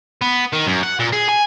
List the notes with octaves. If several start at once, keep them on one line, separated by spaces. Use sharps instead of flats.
B3
D#3
F#2
F#5
A#2
G#4
G#5